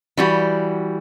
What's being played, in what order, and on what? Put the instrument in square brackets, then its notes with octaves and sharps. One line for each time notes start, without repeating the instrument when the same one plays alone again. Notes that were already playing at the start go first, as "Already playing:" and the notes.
[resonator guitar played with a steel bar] E3 G3 F#4